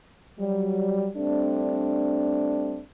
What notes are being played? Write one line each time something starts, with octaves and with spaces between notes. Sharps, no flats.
F#3 G3
G3 A3 C4 D4